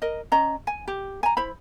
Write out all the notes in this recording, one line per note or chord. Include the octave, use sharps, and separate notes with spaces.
A#4 D#5
C#4 D#5 A#5
G#5
G4
G#5 A#5
E4 C5 B5